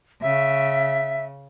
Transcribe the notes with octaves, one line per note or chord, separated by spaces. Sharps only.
C#3 E5